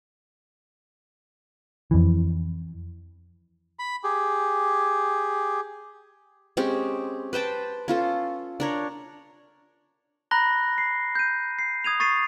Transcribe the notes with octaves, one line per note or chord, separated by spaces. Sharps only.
F2 E3
B5
G4 G#4
G#3 C4 C#4 G4
B4 C5 G5 A5
C#4 F4 A4
D4 A#4 C#5
A#5 B5 F#6 A#6 G7
C7
G6 D#7
C7
D#6 G#6 D#7 F7
C#6 A6 C7 D#7